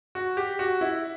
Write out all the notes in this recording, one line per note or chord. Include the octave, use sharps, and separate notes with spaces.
F#4
G4
F#4
E4